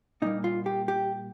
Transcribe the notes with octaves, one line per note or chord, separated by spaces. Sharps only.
A#2 G3 A#3 D#4
F4
G4
G4